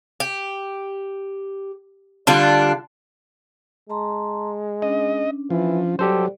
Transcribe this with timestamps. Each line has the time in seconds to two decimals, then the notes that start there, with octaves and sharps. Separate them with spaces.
0.20 G4
2.27 D3 G3 D4 F4
3.90 G#3 A5 A#5 C6
4.82 C#4 D4 D#5
5.50 E3 F3
5.99 F#3 G3 G4 A4 C5